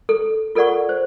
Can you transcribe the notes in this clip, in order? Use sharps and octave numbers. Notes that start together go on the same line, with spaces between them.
A4
F4 A4 A#4 D5 F#5 C#6
C5